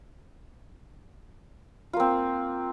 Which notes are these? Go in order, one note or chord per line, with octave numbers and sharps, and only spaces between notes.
A#3 C4 F4